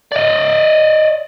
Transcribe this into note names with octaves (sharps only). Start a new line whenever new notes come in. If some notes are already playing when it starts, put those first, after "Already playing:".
D5 D#5